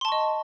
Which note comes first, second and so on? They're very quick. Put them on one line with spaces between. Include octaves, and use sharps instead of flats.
C6 A5 C#6 D#5